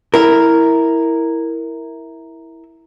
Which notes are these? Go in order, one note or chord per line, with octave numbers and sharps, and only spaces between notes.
E4 A#4